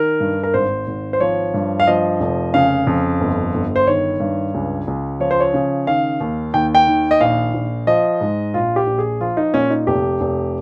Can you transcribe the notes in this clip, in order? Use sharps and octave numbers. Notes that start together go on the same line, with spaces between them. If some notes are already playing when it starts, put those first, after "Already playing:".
Already playing: D#3 A#4
G2
A#4
G#1 C5
G#1
C5
F3 C#5
G2
F5
F3 D#5
F1
C#3 F5
F2
G1
G1
C5
D#3 C#5
G2
C#2
C#2
F3 C#5
C5
C#5
C#3
D#3 F5
D#2
D#2 G5
G5
D#3
D#5
A#1 F5
A#1
F3 D#5
G#2
A#1 F4
G4
A#1
G#4
F3 F4
D#4
A#2 C#4
D#4
F1 G4
F1